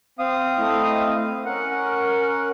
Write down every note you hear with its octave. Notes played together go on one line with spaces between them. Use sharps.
C4 F5 D#6
A3 E4 D#5
C#4 A#4 F#5